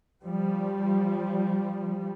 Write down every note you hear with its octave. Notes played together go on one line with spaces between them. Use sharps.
F3 G3